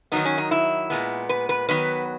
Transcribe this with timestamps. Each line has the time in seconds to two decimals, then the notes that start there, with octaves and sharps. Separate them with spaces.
0.12 D#3 F#3 B3 D#4
0.25 C#4
0.38 D#4
0.51 E4
0.90 A#2 G#3 B3
1.29 B4
1.49 B4
1.69 D#3 F#3 B3 B4